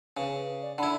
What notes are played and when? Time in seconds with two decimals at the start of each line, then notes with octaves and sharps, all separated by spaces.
0.17 C#3 B4
0.62 D5
0.78 D3 E4 B5